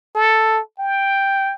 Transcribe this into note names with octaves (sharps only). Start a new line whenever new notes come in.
A4
G5